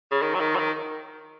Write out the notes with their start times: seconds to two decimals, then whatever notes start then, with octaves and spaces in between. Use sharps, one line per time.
0.11 C#3
0.22 D#3
0.34 F#3
0.40 D#3
0.55 F#3
0.58 D#3